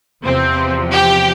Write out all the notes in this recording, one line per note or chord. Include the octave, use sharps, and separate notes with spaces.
E2 C3 F3 C4
G4